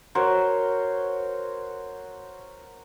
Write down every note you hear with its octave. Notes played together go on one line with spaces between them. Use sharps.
F#4 A#4 C5 C#5